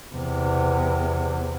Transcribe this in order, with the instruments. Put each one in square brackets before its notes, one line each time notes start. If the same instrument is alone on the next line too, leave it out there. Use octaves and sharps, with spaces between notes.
[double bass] E2 C3